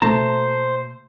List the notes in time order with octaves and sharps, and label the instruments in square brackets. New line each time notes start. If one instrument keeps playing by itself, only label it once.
[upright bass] B2 A#3 [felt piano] A3 [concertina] C5 [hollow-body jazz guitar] A5 A#5